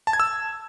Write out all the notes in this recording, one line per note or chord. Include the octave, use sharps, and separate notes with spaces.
A5
G#6
E6